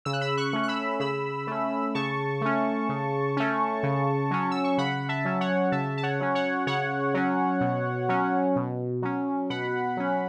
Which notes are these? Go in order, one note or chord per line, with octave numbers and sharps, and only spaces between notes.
C#3 E6
F#6
B5 E6
C#6 F#6
A3 C#4
F#6
B5 E6
C#3 B5 E6
A3 C#4
C#3 A5 C#6
A3 C#4
C#3
A3 C#4
C#3
F#3 C#4
E6
C#6
C#3 F#5 B5
E5 A5
F#3 C#4
C#5 F#5
C#3 E5 A5
A5
C#5 F#5
F#3 C#4
C#5 F#5
C#3 C#5 F#5
F#3 C#4
B2
F#3 C#4
B2
F#3 C#4
B2 F#5 B5
F#3 C#4